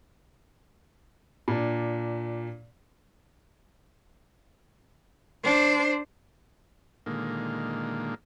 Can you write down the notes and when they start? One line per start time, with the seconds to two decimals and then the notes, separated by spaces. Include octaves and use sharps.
1.48 A#2 D4
5.44 D4 C5
7.06 A#2 D3 D#3 G#3 A#3